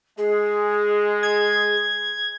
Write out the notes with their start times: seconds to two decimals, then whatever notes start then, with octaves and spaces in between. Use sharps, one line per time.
0.18 G#3 G#4
1.23 G#6